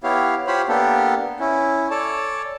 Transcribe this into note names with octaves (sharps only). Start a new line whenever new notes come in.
B3 E4 G4 C#5 F5
F4 G4 C5 C#5 B5
A#3 B3 D4 G4 A4
C#4 E4
A4 C#5 D5 A5